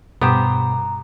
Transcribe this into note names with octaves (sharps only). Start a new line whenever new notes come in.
G2 B2 B3 G4 C5 A#5